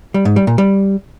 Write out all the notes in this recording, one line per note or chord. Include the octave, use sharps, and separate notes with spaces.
G3
G#2
G3
A#2
G3